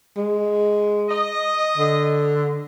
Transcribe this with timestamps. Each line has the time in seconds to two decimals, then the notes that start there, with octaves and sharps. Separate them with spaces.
0.17 G#3
1.09 D#5
1.78 D3